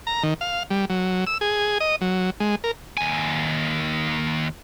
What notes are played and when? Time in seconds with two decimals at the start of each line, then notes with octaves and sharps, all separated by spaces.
0.07 A#5
0.23 D#3
0.41 F5
0.70 G3
0.90 F#3
1.27 E6
1.41 G#4
1.80 D#5
2.01 F#3
2.40 G#3
2.64 A#4
2.97 D#2 G#5